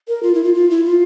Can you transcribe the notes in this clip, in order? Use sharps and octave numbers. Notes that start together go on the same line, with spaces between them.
A#4
F4
E4
F4
F4
E4
F4